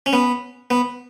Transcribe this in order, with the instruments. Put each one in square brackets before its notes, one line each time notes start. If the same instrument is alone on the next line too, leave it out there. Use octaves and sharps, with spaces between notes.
[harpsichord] C#4
B3
B3